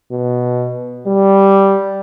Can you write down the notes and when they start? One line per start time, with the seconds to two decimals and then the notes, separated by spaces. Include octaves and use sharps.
0.11 B2
1.06 G3